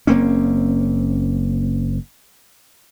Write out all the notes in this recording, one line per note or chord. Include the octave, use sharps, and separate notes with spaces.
F#1 A#3 C4 C#4